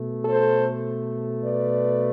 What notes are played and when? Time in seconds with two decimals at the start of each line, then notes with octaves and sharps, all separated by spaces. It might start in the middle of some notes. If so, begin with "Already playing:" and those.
Already playing: B2 A3
0.25 A4 C5
1.43 B4 D5